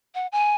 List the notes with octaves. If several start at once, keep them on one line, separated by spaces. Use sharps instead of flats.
F#5
G#5